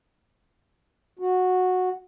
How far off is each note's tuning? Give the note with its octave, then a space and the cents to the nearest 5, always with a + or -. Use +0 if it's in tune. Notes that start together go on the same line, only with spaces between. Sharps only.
F#4 -10